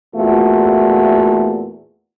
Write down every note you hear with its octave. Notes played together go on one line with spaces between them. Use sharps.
E2 A#2 A3 F4 F#4